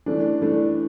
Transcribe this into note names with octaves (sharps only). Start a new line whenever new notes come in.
E3 A3 D4
E3 A3 D4